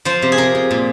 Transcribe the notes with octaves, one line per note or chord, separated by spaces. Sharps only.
F3 C5
C3
G#4
C3 A#4
C3
A#2